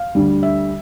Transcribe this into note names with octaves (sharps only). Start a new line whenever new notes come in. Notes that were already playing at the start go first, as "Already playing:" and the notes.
Already playing: F5
D2 D3 G3
E5